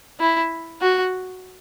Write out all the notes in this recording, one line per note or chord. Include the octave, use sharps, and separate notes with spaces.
E4
F#4